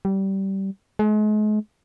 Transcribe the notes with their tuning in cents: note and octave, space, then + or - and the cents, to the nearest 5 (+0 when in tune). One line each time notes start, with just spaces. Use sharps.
G3 -20
G#3 +40